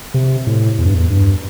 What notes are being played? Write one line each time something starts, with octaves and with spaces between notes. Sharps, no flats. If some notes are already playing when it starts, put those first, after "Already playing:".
C3
A2
E2
G2
E2
G2